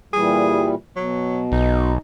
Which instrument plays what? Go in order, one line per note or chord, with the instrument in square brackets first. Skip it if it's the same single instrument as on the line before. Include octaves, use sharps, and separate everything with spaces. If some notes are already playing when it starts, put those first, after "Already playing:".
[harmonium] A#2 E3 G3 [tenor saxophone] G#4
[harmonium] B2 [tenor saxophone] F#3
[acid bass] B1 [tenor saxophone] D#4